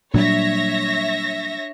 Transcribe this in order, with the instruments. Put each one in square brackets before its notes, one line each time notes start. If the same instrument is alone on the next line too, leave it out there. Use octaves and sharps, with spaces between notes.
[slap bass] A#2 F#3 G3 [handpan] D4 [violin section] C#5 E5 A#6